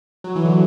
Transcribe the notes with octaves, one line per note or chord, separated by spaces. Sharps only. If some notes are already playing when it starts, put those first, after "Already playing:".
F#3
E3
D3